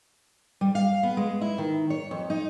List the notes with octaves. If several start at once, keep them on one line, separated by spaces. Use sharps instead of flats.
G3
F5
B3
G#3
E4
D#3
C#5
F2
D#4